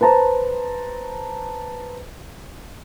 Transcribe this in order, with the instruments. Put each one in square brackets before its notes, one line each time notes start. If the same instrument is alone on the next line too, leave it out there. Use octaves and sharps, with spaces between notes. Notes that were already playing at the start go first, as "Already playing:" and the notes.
[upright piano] B4 C5 A5 A#5